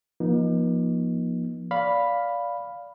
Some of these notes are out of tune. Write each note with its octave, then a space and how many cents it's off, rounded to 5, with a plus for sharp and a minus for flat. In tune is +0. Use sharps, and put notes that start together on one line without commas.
F3 +0 A#3 +45 D#4 +0
D5 -20 F5 +0 B5 +0